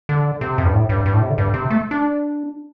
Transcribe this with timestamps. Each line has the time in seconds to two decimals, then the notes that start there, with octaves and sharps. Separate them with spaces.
0.09 D3
0.41 C3
0.58 F2
0.65 G2
0.74 A2
0.89 G2
1.06 G2
1.13 A2
1.22 C3
1.30 D3
1.38 G2
1.54 C3
1.70 A3
1.91 D4